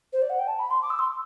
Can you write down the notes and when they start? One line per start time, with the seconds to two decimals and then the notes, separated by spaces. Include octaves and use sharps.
0.13 C5
0.22 D5
0.30 F#5
0.39 G5
0.47 A5
0.59 B5
0.71 C6
0.82 D6
0.90 E6
0.99 C6